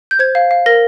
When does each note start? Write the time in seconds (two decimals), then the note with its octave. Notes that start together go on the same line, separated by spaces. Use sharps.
0.11 G6
0.19 C5 G#6
0.35 F5
0.51 F5
0.66 A#4 A#6